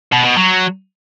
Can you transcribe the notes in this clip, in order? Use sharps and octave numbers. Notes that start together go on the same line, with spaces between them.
B2
B2
F#3